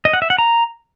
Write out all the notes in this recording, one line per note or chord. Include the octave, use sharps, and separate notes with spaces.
D#5
F#5
E5
F#5
A#5